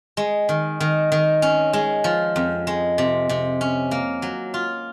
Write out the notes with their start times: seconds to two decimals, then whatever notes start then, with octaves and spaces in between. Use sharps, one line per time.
0.17 G#3
0.49 D#3
0.80 D#3
1.12 D#3
1.42 C#4
1.73 G#3
2.04 F3
2.36 F2
2.67 G#3
2.98 C3
3.29 C3
3.61 C#4
3.91 A#3
4.22 F#3
4.54 F4